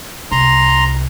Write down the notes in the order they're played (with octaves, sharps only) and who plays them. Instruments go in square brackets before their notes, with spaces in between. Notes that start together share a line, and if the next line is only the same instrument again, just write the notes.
[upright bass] C2 [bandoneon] A#5 C6